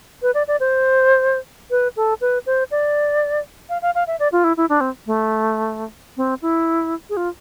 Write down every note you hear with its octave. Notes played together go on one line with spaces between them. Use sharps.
B4
D5
D5
C5
B4
A4
B4
C5
D5
F5
F5
F5
E5
D5
F4
E4
E4
D4
C4
A3
C4
E4
G#4
F4